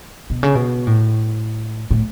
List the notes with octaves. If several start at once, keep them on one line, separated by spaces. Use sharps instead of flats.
B2
C#3
B2
A2
A2